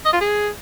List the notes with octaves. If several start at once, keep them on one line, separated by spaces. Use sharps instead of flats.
D#5
F4
G#4